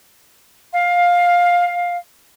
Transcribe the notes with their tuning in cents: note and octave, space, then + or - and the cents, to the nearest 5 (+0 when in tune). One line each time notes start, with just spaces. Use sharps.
F5 +15